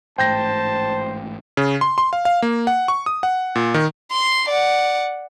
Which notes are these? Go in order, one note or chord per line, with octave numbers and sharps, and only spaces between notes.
A1 G#2 A3 C5 G5 A5 G6 A#6
C#3
C6
C6
F5
F5
A#3
F#5
C#6
D#6
F#5
A#2
D#3
C6 C7
D5 F#5